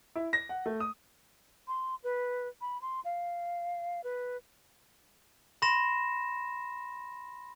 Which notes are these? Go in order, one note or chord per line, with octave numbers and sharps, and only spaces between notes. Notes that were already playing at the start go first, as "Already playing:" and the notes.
E4
A#6
F#5
A3
D#6
C6
B4
B5
C6
F5
B4
B5 C6 A#6 E7